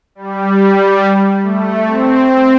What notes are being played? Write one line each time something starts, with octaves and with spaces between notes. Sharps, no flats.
G3
A3
C4
C4